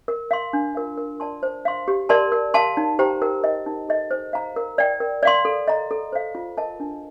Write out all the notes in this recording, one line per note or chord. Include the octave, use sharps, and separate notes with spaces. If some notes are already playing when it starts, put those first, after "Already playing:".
A#4
F5 C6
D4
F4 A#4 F5
A#4
D5 A5 C6
C5
F5 C6
G4
A#4 D5 A5 C6
A#4
F5 A5 C6
D#4
G4 C5 G5 A#5
A#4
D#5 G5
D#4
A4 D#5
C5
F5 A#5
A#4
D5 G5
A#4
D5 F5 C6
A4
D#5 A#5
A4
C5 F5
F4
A#4 D#5 A5
D4